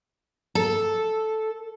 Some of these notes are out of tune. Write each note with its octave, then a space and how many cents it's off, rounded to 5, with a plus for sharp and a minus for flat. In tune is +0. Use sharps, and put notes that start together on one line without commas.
A4 -5